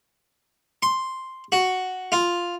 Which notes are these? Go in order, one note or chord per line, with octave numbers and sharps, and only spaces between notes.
C6
F#4
F4